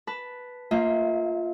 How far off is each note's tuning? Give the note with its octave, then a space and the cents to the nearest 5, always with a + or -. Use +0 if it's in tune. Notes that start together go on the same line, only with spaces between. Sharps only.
B4 +0 A5 +0
A#3 -25 F4 +0 E5 -45